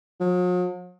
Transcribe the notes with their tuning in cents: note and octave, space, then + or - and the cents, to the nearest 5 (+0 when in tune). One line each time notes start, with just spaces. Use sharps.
F#3 -45